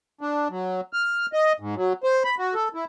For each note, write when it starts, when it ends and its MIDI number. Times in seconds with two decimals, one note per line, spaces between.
0.21 0.48 62
0.50 0.81 54
0.93 1.26 89
1.33 1.53 75
1.60 1.75 44
1.76 1.93 54
2.04 2.23 72
2.24 2.35 83
2.39 2.54 66
2.54 2.68 69
2.74 2.85 64